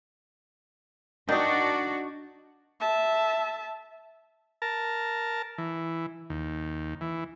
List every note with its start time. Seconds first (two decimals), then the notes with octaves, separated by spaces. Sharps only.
1.29 D#3 D4 D#4 F#4
2.80 E5 A5
4.62 A#4 A5
5.58 E3
6.30 D#2
7.01 E3